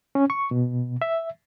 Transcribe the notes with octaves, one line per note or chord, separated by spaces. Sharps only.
C#4
C#6
B2
E5